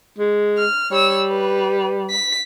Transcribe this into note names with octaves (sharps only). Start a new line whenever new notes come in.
G#3
F6
G3 C#5 E6
B4
B6